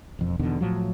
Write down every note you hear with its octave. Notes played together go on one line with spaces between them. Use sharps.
E1 F2
E2 B2 D3 D#3
A2 F3 F#3